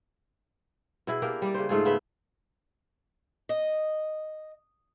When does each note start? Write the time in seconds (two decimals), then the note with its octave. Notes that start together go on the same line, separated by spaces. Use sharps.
1.07 B2 E4 G#4
1.22 A#3 D4 G4 A#4
1.42 G3 D5
1.54 C#3 C5
1.69 G#2 A3 F4 G#4
1.85 C#3 B3 E5
3.49 D#5